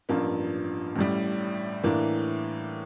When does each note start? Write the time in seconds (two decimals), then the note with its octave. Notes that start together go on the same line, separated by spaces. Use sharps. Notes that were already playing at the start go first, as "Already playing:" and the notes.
0.09 A1 G2 F3 A#3
0.96 A1 A2 G3
1.84 A2 E3 A#3 D4